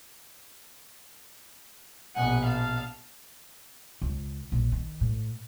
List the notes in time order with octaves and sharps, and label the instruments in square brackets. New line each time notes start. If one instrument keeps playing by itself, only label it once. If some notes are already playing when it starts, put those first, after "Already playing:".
[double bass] A#1 B2 [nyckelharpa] F#5 G#5
[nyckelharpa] F5 A5
[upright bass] C#2
A#1
D#3
A2